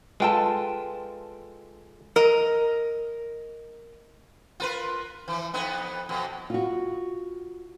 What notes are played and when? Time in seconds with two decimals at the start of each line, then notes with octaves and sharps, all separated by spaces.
0.20 G#3 F4 A4 B4 G5 A5
2.16 A#4 D#5
4.60 F4 A#4 B4
5.28 E3 F3
5.54 F2 B3 D#4
6.09 F2 B2
6.50 F4 F#4